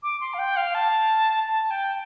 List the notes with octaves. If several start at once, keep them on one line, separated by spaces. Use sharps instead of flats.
D6
C6
F5
G5
F5
A5
A5
G5